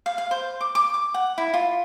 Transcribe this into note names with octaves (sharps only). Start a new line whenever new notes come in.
F5
F5
C5
D6
D6
D6
F#5
E4
F4